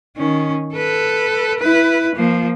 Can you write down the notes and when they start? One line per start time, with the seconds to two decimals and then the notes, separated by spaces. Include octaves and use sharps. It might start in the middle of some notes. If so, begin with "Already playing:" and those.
0.17 D#3 C#4
0.75 A4 B4
1.60 E4 B4
2.15 F3 A#3